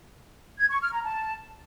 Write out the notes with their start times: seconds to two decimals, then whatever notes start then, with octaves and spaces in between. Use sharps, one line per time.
0.58 G#6
0.70 C#6
0.81 F6
0.92 A#5
1.04 A5